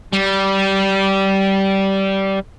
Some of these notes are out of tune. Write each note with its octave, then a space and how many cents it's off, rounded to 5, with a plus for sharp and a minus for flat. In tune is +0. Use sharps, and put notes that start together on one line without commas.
G3 -15